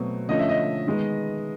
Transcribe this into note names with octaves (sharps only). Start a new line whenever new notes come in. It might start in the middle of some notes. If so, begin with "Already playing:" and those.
Already playing: B2 F#3 A3 C4
D3 F3 A3 C#4 D#5
E5
D#5
D#3 G#3 B3